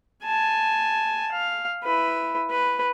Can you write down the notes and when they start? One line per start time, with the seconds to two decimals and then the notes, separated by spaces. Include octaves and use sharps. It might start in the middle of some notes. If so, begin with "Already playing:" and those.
0.25 G#5 A5
1.32 F5
1.84 E4 B4
2.51 B4